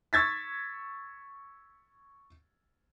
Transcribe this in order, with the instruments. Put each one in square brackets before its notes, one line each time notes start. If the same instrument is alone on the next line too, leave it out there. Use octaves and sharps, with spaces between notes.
[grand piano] C#6 E6 G#6 A6 B6